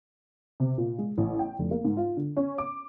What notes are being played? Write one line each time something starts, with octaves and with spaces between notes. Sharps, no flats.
C3
A#2
G#3
A1
G5
F1
A#3
G#2
F4
D3
C#4
D6